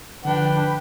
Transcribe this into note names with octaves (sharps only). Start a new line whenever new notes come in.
D3 F3 D4 B4 G5